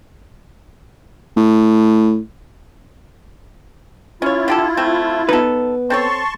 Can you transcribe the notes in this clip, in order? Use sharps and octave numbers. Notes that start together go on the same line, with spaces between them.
A2
C#4 E4 F4 C#5
D3 G4 A4
A3 C4
B3 D#4 A4 B4
C4 A4 C#5 A5 C6 C#6